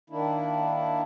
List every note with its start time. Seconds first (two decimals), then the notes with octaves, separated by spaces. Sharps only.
0.10 D#3 A#3 D4 E4